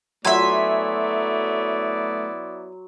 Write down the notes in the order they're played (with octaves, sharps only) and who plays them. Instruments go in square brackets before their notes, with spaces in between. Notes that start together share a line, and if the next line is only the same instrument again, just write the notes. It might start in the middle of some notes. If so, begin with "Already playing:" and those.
[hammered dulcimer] F#3 C6 [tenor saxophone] A3 [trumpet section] B3 E4 D5 [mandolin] E5 G#5